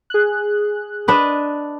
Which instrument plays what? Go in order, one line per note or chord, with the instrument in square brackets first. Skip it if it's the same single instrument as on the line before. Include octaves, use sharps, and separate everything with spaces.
[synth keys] G#4 F#6
[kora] D4 B4 D#5